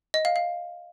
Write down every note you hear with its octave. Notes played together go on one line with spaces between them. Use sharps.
D#5
F5
F5